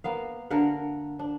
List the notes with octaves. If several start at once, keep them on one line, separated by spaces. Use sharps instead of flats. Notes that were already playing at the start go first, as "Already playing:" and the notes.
A#3 B3 F5
D3 A#4 F5 F#5
D4